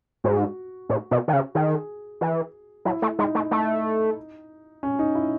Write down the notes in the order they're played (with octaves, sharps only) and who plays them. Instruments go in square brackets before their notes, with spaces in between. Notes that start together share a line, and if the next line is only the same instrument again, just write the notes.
[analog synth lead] G#2 [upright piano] F#4
[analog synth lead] A2
B2
D#3
C#3
[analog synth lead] D#3 [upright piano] G#4
[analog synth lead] E3
[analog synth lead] F#3 [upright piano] E4
[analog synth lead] A3
[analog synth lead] G#3 [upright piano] D#4
[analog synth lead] A3
A3
[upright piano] C#4
D#4
E4